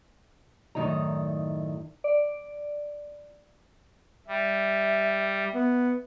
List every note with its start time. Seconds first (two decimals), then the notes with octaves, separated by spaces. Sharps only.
0.75 F#2 A2 D#3 D#4 D5 A#5
2.04 D5
4.28 G3 E5
5.54 B3